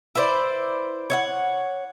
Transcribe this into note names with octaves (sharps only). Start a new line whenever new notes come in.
E4 B4 C5 D5
C#5 E5 F#5